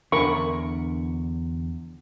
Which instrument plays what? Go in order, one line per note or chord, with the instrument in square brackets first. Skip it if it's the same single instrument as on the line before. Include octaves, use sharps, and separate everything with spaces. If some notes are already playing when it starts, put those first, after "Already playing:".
[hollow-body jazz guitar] E2 D3 E5 [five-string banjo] A#4 B5 [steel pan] C#6